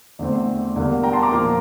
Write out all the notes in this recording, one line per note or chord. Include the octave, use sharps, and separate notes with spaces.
E2 D3 A3 C4
E2 D3 G3 A#3
G5 A#5
A5 C6
A#5 D6
A#2 F3 A#3